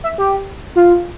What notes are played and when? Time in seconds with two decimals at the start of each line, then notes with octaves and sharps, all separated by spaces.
0.04 E5
0.18 G4
0.76 F4